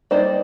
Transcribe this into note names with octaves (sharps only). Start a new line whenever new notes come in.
G3 A#3 D#4 C5 D5